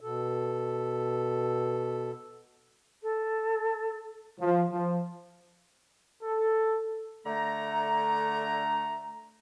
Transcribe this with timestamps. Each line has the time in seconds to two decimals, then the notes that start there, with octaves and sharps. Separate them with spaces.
0.01 B2 A4
3.02 A4
4.40 F3
4.71 F3
6.23 A4
7.25 D3 A3 A#5